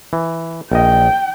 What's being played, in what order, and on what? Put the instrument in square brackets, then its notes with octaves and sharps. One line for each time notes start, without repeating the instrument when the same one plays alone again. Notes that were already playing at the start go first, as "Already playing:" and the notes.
[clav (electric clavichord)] E3
[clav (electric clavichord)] A#1 D#5 [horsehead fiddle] G5